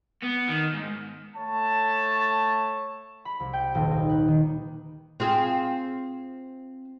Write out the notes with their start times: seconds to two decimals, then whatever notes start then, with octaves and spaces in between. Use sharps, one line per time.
0.22 B3
0.48 D#3
0.73 G#2
1.36 A3 C#5 A5
3.25 B5
3.40 C2
3.53 G5
3.75 D#1
3.91 D#4
4.09 B4
4.28 D#3
5.20 C4 F4 G#4